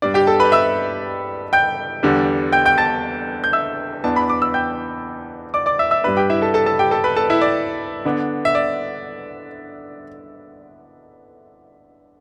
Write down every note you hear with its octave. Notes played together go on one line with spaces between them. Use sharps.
G2 G3 D4 D5
G4 G5
A4 A5
B4 B5
E5 E6
G5 G6
E2 D3 G3 D4
G5 G6
G5 G6
A5 A6
G6
E5 E6
E2 E3 B3 D4 A5
B5
D6
E6
G5 G6
D5 D6
D5 D6
E5 E6
E5 E6
G2 G3 D4 B4 B5
G4 G5
E4 E5
A4 A5
A4 A5
A4 A5
G4 G5
A4 A5
B4 B5
A4 A5
E4 E5
D5
D3 B3 D4
E5
D5